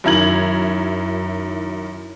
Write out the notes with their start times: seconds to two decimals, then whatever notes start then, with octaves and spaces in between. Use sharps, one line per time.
0.04 F#2 D#3 E4 A#5 G#6 F#7